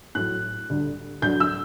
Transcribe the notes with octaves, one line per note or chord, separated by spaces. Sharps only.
A2 F#3 F#6
D2 D3 G3
D2 D3 F#3 G6
E6